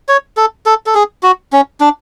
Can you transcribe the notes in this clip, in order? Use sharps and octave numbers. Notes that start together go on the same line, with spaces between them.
C#5
A4
A4
A4
G#4
F#4
C#4
D4